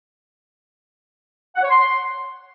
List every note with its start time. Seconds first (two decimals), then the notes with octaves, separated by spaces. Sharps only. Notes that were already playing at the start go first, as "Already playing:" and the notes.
1.56 F#5
1.63 C#5
1.70 C6